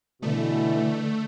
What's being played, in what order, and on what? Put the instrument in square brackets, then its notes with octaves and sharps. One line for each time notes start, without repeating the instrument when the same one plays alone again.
[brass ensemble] B2 E3 [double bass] D3 [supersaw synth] A3